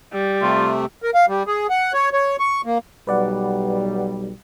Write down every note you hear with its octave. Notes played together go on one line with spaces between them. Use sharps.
G3
C3 A3 F4
A#4
F5
G3
G#4
F#5
C#5
C#5
C#6
A#3
B1 G3 B4 D5 F#5